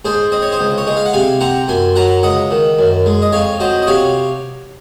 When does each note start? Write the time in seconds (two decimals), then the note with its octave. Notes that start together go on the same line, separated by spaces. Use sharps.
0.05 G#2 G#4 C5
0.32 C4 D#5
0.42 C#5
0.52 C5 D#5
0.59 C#2
0.78 C#5
0.87 G#3 D#5
0.97 F5
1.06 F#5
1.13 C3 F5 G#5
1.41 C4 F#5 A#5
1.68 F#2 G#5 C6
1.96 F#3 F#5 A#5
2.23 C#2 D#5 F#5
2.51 D#3
2.79 F#2
3.06 G#3
3.22 D#5
3.32 F2 C#5 F5
3.60 F#3 C5 D#5
3.82 D#5
3.87 C3 C#5 F5